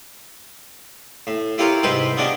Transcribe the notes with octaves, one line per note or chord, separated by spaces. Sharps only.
A2
E4 F4 G4 A#4 C#5 F5
G#2 C3 G#3 B4 C5 G5
C#3 B3 C#4 D4 G4 D#5